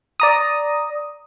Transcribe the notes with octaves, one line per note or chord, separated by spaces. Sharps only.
D5 A#5 D#6